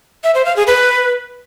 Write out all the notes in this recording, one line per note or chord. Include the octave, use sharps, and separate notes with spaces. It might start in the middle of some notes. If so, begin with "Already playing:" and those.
E5
C5
F5
G#4
B4